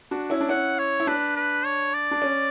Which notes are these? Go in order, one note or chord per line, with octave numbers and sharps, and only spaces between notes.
D4 F#4
C#4 E4
D4
C#4 E4 F#5
C#5
E4
D4 B4
B4
C#5
D5
D4
C#4